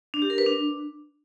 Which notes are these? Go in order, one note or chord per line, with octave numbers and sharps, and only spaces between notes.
D4
G4
A#4
B4
D4